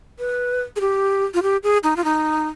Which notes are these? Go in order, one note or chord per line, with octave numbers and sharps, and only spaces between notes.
B4
G#4
G4
F4
G4
G#4
D#4
F4
D#4